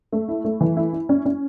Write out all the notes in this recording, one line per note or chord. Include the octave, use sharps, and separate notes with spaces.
A3
E4
A3
E3
E4
E4
C#4
C#4